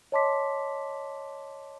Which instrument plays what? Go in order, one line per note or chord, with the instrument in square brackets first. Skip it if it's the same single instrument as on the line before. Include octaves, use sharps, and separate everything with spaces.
[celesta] C#5 D#5 A5 C6 D6 B6